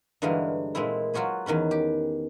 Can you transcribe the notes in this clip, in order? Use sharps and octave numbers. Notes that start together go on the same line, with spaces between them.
G2 D3 E3 F#3 G#3 F5
A#2 G#3 A3 C4 E4
F#3 F4 F#4 G#4 B4
E2 D#3 C#4 B4
G4